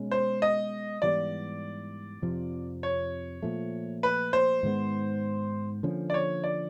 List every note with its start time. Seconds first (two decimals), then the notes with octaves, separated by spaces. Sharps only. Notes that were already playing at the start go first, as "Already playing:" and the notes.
Already playing: B2 G#3 C#4
0.11 C5
0.42 D#5
1.02 G#2 E3 G3 B3 D5
2.22 F2 C3 F3
2.83 C#5
3.43 A#2 F3 A3
4.03 B4
4.33 C5
4.63 G#2 D#3 G#3 B3
5.83 D3 F3 A#3 C#4
6.10 D5
6.14 C#5
6.44 D5